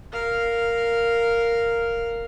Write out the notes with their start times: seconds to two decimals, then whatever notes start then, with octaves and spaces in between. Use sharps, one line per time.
0.13 A#4 F5